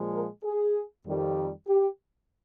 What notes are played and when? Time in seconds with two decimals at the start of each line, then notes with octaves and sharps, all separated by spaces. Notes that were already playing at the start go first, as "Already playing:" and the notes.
Already playing: A#2 F3 G#3
0.13 A#4
0.44 G#4
1.06 F2 D#3 G3
1.68 G4